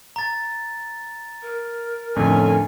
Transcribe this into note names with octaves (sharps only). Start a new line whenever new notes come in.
A#5 A6
A#4
F2 A2 D3 C#4 G#5